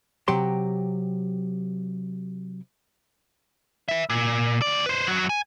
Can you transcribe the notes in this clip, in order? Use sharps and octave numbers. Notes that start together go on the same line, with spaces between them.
C3 F#3 G4 C#5 C6
B4 E5
A#2
D2 D5
B4 C5
F#2 F#3
G#5